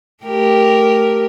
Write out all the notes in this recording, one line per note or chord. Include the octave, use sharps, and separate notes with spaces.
A3 G4 A#4